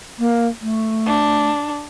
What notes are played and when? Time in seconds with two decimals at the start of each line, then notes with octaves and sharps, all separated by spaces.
0.19 A#3
0.62 A3
1.06 D4